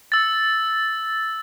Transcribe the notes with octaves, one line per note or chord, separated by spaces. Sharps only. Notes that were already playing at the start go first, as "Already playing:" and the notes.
E6 A6